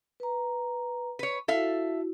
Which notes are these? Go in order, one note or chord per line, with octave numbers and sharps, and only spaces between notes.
B4 A#5
B4 C#5
E4 F#4 A4 E5 F5